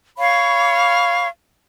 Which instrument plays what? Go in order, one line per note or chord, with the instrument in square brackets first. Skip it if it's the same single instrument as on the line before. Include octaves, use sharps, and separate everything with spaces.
[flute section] C#5 F5 B5 C#6